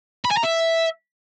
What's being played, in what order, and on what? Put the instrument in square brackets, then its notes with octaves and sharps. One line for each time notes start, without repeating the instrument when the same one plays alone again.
[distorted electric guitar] B5
G#5
A#5
E5